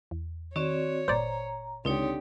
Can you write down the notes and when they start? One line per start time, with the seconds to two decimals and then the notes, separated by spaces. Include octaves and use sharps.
0.11 E2
0.56 D#3 C4 F#4 C#5 D5 C#6 E7
1.08 G1 A#2 C5 D5 A#5
1.85 C#2 D3 C4 D#4 G4 C#5